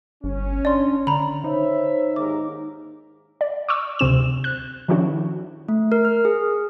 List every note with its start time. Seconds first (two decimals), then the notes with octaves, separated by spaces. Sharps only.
0.24 G1 C#4
0.65 D4 D5 C6
1.07 D3 A#5 B5
1.44 D#4 C5 C#5 E5
2.16 D#2 G#2 A#4 D6
3.41 D5
3.69 C#6 D6 E6
3.99 D2 C3 C4 E7
4.44 F#6
4.88 D#3 F3 C#4 D4 E4 F#4
5.69 A3
5.92 A#4
6.05 F6
6.25 G#4